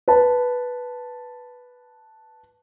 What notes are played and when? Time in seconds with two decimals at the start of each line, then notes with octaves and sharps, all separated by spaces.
0.08 B4 A5